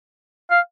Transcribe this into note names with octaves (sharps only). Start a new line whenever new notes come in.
F5